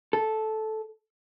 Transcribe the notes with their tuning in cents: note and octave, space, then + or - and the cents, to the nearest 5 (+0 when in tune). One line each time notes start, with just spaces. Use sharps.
A4 -10